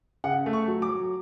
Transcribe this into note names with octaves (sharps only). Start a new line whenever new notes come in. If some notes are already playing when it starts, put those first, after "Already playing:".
C#3 F#5
A3
C#6
F#3
D6
F#3